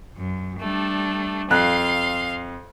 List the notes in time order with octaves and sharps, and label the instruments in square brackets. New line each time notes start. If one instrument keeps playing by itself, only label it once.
[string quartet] F#2
G3 A3 D4
[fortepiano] F2 F#6 [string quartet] F5 C6